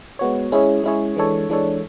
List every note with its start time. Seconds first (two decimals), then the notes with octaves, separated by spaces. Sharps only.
0.19 G#3 B3 F#4 C#5
0.52 G#3 C#4 E4 G#4 C#5
0.84 G#3 C#4 E4 G#4 C#5
1.16 E3 G#3 D4 A4 C#5
1.50 E3 G#3 D4 A4 C#5